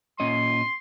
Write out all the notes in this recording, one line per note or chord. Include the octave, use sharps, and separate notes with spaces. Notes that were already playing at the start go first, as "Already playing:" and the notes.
A#2 C#4 D#5 C6